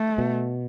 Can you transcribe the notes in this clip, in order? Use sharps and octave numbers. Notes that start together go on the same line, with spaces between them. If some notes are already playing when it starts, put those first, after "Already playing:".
Already playing: A3
B2